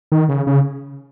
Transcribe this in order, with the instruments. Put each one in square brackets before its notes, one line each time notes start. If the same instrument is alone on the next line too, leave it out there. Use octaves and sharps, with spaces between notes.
[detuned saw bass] D#3
C#3
C#3